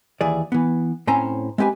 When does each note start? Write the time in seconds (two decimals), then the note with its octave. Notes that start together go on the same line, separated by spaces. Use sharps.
0.21 D#2 E3 G#4 D5
0.52 E3 B3
1.07 A2 C4 C#4 C5 G#5 A#5
1.58 G#3 C4 G4 B4 G#5